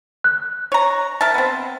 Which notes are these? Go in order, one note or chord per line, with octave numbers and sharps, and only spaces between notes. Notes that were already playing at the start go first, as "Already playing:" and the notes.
F#6
C#5 A#5
A#4 E5 A5
B3 C4